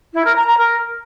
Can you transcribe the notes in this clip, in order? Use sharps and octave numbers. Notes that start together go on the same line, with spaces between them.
E4
A#4
A#5
A#5
A#4